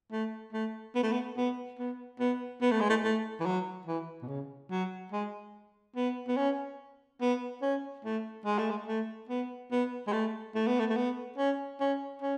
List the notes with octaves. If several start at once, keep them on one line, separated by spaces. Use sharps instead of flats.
A3
A3
B3
A3
B3
B3
B3
B3
B3
A3
G#3
A3
A3
E3
F#3
E3
B2
C#3
F#3
G#3
B3
B3
C#4
B3
C#4
A3
G#3
A3
G#3
A3
B3
B3
G#3
A3
A3
B3
A3
A3
B3
C#4
C#4
C#4